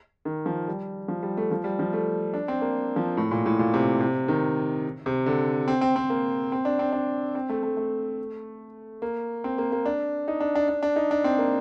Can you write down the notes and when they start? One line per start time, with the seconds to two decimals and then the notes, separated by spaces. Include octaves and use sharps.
0.25 D#3
0.46 F3
0.68 G3
1.08 F3
1.23 G3
1.37 A3
1.51 F3
1.64 G3
1.79 F3
1.93 A3
2.34 D4
2.48 C4
2.61 A#3
2.96 F3
3.17 A2
3.31 A#2
3.46 A2
3.59 A#2
3.74 C3
4.01 C3
4.28 D#3
5.06 C3
5.26 D3
5.68 C4
5.81 C4
5.96 C4
6.10 A#3
6.52 C4
6.65 D4
6.79 C4
6.93 D4
7.35 C4
7.49 A3
7.63 A3
7.77 A3
9.02 A#3
9.44 C4
9.58 A#3
9.72 A#3
9.86 D4
10.28 D#4
10.40 D4
10.55 D4
10.69 D4
10.83 D4
10.96 D#4
11.11 D4
11.24 C4
11.38 A#3